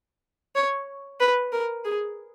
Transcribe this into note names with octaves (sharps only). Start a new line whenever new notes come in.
C#5
B4
A#4
G#4